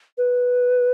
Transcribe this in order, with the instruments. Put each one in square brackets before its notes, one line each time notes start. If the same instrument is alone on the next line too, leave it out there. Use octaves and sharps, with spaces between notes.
[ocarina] B4